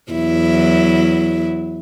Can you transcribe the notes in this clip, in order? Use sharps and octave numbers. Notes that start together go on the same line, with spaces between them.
E2 F#3 E4